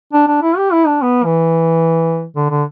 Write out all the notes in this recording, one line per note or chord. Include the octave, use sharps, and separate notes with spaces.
D4
D4
E4
G4
E4
D4
B3
E3
D3
D3